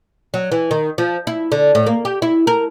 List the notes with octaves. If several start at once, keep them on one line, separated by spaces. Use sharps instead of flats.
F#3
E3
D#3
F3
E4
D3
A2
A#3
G4
E4
A#4